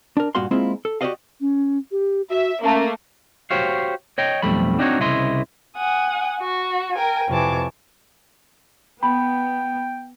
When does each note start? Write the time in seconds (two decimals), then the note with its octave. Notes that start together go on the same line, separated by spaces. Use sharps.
0.17 D4 A#4
0.35 G2 A#2 F#4 F5 C6
0.51 G#3 A#3 C4 E4 F4
0.85 A4
1.01 F#4 G4 A#4 D5 D#5 F5
1.41 C#4
1.92 G4
2.30 F#4 E5
2.62 A3 A#3 C#4
3.51 F#4 G4 C5 C#5 F5
4.18 C#5 D#5 G5
4.42 B1 F2 G3 A3 B5
4.79 C4 D4 D#4 F#4 A#4 C#5
5.00 C2 C#3 E4 D#5 C6
5.77 F#5 G#5 D#6
6.40 F#4
6.93 A#4 G5 G#5
7.29 F2 C3 E3 C#5 A5 D6
9.03 B3 G5 B5